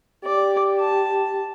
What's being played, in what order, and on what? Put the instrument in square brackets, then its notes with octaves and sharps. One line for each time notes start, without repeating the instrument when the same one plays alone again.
[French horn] G4 [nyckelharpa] D5
[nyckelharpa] A5